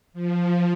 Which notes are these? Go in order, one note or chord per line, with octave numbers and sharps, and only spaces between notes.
F3